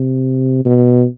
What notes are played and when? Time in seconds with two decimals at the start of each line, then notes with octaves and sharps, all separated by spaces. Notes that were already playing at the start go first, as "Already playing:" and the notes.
Already playing: C3
0.65 B2